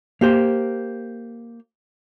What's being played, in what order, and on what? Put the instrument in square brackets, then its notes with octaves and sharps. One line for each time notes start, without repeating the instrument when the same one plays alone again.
[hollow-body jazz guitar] A#3 G4 C5